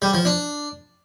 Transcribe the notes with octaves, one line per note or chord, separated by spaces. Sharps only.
G3
F3
D4